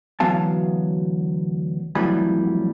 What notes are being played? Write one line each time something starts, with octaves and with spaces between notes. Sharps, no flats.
D2 E3 F#3 B3 F5 A5
F2 A2 E3 F#3 G3 B5